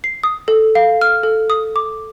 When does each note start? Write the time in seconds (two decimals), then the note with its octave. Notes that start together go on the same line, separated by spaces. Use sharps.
0.04 C7
0.24 D#6
0.48 A4
0.75 F5
1.01 F6
1.23 A4
1.50 D#6
1.76 D6